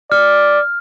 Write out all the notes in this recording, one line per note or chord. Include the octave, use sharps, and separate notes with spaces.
D5 F6